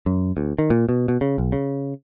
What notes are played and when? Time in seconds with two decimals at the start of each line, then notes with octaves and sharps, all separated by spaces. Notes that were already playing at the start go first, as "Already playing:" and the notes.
0.06 F#2
0.37 D2
0.59 D#3
0.70 A#2
0.89 B2
1.08 B2
1.21 C#3
1.38 B1
1.52 C#3